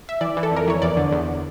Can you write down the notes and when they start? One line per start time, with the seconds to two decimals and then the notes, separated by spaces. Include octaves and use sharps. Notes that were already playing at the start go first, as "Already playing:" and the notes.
0.09 E5
0.21 E3 D5
0.37 E3
0.43 A4
0.52 F2 A#4
0.68 E3 C#5
0.82 E2 D5
0.97 D3
1.12 E2